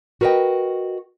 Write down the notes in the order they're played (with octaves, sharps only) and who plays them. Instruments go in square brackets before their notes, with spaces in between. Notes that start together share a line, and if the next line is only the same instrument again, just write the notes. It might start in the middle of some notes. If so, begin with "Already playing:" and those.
[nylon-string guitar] F#4 A#4 B4 C#5 D#5 G5